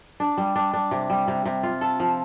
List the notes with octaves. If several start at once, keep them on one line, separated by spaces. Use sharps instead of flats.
D4
G3
D4
D4
C3
G3
C3
C3
F4
A4
F3